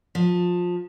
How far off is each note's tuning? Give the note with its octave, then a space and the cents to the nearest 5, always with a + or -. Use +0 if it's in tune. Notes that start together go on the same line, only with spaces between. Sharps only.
F3 +20